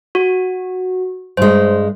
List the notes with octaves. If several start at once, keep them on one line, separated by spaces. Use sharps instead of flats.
F#4
G2 G#3 C5